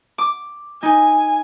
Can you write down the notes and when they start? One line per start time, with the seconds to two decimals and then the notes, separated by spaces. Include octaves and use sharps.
0.18 D6
0.83 D#4 G#5